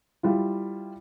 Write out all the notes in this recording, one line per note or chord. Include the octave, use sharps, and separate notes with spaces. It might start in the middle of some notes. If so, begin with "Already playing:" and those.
G3 E4 F4